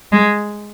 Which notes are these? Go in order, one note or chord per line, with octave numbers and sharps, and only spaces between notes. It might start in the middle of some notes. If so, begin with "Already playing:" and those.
G#3